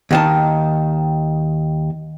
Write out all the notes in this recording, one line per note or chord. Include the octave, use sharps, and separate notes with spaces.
D#2 D#3 A5